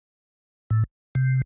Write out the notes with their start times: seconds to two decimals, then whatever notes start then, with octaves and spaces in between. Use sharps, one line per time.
0.70 A2
1.15 C3